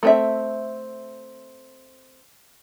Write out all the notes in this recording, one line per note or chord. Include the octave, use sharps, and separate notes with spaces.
A3 C4 E5